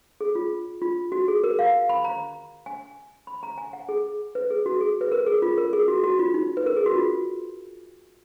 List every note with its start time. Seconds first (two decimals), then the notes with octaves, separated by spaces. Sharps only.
0.21 G#4
0.35 F4
0.82 F4
1.12 F#4
1.28 G#4
1.44 A#4
1.59 F5
1.89 B5
2.04 A#5
2.66 G#5
3.27 B5
3.43 A#5
3.58 G#5
3.73 F#5
3.89 G#4
4.35 B4
4.50 G#4
4.66 F#4
4.81 G#4
5.01 B4
5.12 A#4
5.27 G#4
5.42 F4
5.58 A#4
5.73 G#4
5.88 F#4
6.03 F#4
6.19 F4
6.34 D#4
6.57 B4
6.66 A#4
6.77 G#4
6.86 F#4
6.96 F4